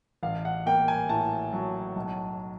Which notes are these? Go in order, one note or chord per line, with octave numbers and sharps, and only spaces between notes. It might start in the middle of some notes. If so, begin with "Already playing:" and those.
A1 F5
F#5
A#3 G5
G#5
A2 A5
F#3
B1